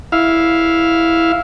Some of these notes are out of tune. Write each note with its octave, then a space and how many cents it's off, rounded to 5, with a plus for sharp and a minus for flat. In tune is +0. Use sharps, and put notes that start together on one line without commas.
E4 +0 F5 +0